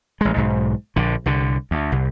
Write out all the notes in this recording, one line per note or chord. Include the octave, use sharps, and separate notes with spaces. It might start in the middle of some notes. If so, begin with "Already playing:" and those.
A1 G#3
B1 G#2
A#1 D3
C2 D3
D2
C2